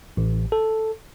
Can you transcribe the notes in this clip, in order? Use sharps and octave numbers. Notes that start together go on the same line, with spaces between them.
A1
A4